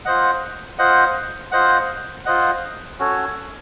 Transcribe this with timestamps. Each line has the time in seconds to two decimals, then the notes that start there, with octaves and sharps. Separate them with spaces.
0.05 F4 C5 D#5 F#5
0.79 F4 C5 D#5 F#5
1.52 F4 C5 D#5 F#5
2.25 F4 C5 D#5 F#5
2.99 C#4 F#4 A4 C#5